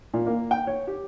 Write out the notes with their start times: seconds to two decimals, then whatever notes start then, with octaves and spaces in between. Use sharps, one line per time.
0.14 A#2
0.26 A#3
0.51 G5
0.67 C#5
0.87 G4